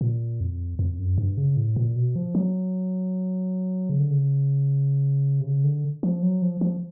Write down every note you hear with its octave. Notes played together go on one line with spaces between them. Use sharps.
A#2
F2
F2
F#2
G2
C#3
A2
A#2
B2
F3
F#3
C#3
D3
C#3
C3
C#3
D3
F3
F#3
F3
F3